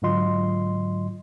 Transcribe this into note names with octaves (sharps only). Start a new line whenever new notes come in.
G#2 D3 F#3 F4 D#5 C6